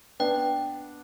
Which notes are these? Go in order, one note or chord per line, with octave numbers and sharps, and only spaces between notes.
B3 D4 G5